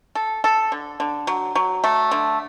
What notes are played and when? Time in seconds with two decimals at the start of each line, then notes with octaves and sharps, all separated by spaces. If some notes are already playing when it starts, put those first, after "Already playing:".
0.15 A4
0.44 A4
0.72 D3
1.00 D3
1.27 F#3
1.55 F#3
1.84 A3
2.11 D3